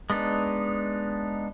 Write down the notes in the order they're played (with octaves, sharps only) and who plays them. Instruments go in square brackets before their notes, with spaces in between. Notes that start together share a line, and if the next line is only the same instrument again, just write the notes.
[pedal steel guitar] G#3 B3 D4 D#4